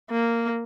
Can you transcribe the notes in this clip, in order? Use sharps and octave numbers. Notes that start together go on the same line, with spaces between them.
A#3